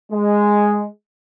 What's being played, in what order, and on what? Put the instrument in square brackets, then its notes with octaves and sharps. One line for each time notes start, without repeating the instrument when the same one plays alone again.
[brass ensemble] G#3